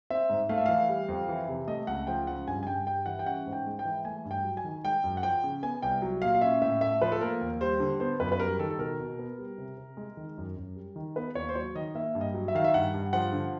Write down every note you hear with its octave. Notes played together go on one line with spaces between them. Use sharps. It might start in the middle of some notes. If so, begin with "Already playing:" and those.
C4 E5
G#2
A3 F5
E5
E3 F5
G3
F2
E3
C3
A3 D#5
C#2 F#5
F3 G5
C#3 F#5
G2 G#5
G#5
G2 G5
G3 G5
E3 F#5
G5
C#4 F#5
G#2
G5
G#3
G5
E3
A3 G#5
G2
G5
F#3
G#5
D#3
G#3 G5
F#2
F#5
F3 G5
C#3
B3 G#5
C2 G5
F#3
A#2 F5
F5
C#4 E5
A2 E5
A3 E5
F3 B4
A4
A#3 A#4
D#2
G3 C5
D3
B3 C5
F#2 B4
B4
G3 A#4
D#3 A4
A4
B2 A#4
B2
B3
G3
C3
C3
G#3
D#3
F#2
F#2
G3
D#3
B3 B4
D#2 C#5
C5
F#3 C#5
D#3 D#5
A#3 E5
G2
D#5
F#3
E5
D#3 F5
E5
G2 F#5
G2
F3 F#5
D3